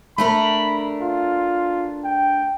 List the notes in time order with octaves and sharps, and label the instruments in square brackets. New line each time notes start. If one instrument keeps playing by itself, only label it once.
[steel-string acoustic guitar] A3 D4 A#4 [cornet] B5
[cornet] F4
G5